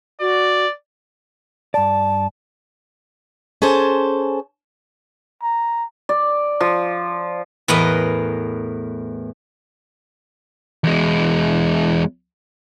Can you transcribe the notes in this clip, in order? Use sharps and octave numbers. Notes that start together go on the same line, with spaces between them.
F#4 D5
G2 D5 A5
C#4 G#4 A4 C5 A5
A#5
D5
F3
E2 A2 A#4 B4 D#5
E2 G#3